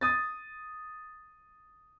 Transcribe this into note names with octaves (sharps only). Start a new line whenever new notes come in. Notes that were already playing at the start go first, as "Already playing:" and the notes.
D#6 A6